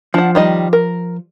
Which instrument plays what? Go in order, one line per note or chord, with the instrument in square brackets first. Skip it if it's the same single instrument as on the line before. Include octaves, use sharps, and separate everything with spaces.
[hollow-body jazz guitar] F3 [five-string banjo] D4 F#5
[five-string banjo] D#3 G3 D#5
A#4